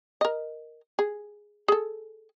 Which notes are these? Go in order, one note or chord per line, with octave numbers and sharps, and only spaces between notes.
A#4 D#5
G#4
G#4 A4